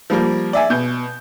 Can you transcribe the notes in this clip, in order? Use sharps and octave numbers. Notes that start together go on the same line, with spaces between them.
F3 G3 A#3
D5 E5 G#5
B2 G6